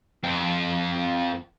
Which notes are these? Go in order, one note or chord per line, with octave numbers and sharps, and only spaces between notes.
F2 C4